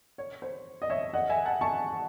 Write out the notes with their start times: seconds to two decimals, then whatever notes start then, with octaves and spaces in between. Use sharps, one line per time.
0.18 C#5
0.42 C5
0.82 D#5
0.90 C#5 E5
1.13 D#5 F#5
1.29 E5 G#5
1.45 F#5 A5
1.61 A5 C#6